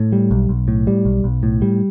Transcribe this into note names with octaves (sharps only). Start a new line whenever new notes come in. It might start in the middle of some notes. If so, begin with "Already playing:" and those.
Already playing: A2
G3
B1
B1
A2
G3
B1
B1
A2
G3